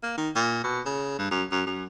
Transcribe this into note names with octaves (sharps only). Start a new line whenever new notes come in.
A#3
D#3
A#2
B2
C#3
G2
F#2
F#2
F#2